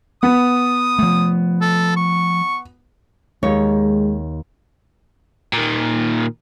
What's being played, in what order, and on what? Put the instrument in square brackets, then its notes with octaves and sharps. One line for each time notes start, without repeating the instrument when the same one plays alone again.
[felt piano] B3 [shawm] D#6
[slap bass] F3 A3
[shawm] A4
C#6
[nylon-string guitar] D#2 D#4 C#5 [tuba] G#3
[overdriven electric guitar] A#2 D#3